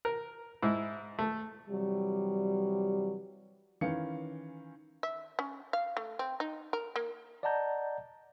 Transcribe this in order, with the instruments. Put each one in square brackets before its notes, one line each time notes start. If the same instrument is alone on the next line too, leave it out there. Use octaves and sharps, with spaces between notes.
[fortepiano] A#4
G#2 E4
A3
[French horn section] C3 E3 F#3 G3
[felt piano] D#3 E3 C#4 F5 C#7
[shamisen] E5
C#4
F5
A3
C4
D#4
A#4
A#3
[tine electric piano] D5 D#5 F#5 A5 A#5 G6